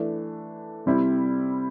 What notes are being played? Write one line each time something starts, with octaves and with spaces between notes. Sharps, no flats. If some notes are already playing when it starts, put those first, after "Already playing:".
Already playing: E3 A3 D4
C3 G3 C4 E4